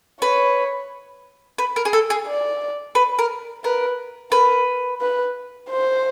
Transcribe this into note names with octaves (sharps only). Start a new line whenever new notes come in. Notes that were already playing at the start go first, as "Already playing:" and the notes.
B4 C#5
B4
A#4
G#4
A4
G#4
D5
B4
A#4
A#4 B4
A#4 B4
B4
C5